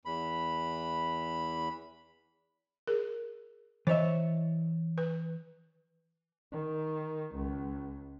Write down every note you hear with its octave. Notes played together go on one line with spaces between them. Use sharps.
E2 B5
G#4 A#4
E3 C5 C#5 D#5 E5
B4
D#3
C#2